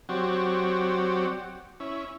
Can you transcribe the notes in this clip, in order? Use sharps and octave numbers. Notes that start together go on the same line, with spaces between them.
F#3 C4 F#4 G4 C#5 D5
C#4 E4